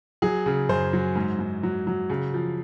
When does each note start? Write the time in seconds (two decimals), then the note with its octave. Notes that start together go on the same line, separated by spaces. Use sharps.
0.22 F#3 G#4
0.46 C#3
0.69 F#2 C5
0.93 F#3
1.16 G#2
1.39 G#2
1.63 F#3
1.87 F#3
2.10 C#3
2.34 F3